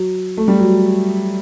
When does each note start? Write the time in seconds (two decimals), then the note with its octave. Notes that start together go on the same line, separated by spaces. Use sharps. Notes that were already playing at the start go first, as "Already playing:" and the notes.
Already playing: F#3
0.37 A3
0.48 G3
0.59 F#3